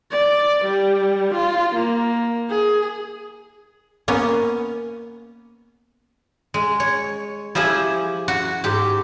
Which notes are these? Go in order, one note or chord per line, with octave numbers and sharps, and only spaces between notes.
D5
G3
F4
A#3
G#4
A#3 B3 C#4
G#3
C#5
F3 E4 G4 G#4
F#4
G#2 G4